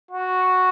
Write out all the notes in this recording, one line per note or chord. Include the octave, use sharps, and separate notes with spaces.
F#4